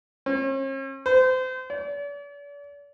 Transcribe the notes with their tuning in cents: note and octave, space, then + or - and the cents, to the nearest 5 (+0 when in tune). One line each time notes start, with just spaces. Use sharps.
C#4 -45
C5 -30
D5 -40